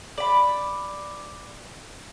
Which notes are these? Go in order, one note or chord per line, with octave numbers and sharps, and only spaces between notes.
D5 B5